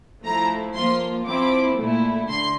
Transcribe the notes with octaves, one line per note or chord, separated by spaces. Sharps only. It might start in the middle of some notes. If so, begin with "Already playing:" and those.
F3 A3 E4 A#5
F3 A#3 F4 C6
F3 C4 E4 D6
A#2 A3 E4
D3 C6